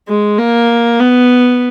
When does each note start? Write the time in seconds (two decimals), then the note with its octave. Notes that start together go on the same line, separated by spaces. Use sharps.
0.08 G#3
0.39 A#3
1.00 B3